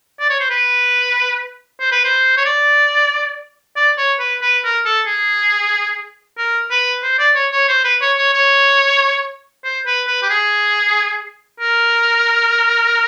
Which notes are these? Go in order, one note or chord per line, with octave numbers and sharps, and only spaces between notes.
D5
C#5
C5
B4
C5
B4
C5
C#5
D5
D5
C#5
B4
B4
A#4
A4
G#4
A#4
B4
C5
D5
C#5
C#5
C5
B4
C#5
C#5
C#5
C5
B4
B4
G4
G#4
A#4